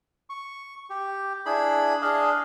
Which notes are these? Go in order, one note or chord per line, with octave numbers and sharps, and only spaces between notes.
C#6
G4
D4 E4 G#4 B5
D4 G#4 D#5 F5